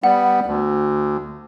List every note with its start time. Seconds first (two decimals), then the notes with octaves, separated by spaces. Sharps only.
0.04 G3 B3 F#5
0.46 D2